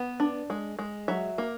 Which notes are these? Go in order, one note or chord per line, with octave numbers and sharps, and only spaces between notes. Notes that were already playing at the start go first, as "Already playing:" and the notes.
Already playing: B3
D4
G#3
G#3
F#3 E5
A#3